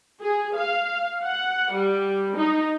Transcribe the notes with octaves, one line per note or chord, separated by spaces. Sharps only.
G#4
F5
F#5
G3
D#4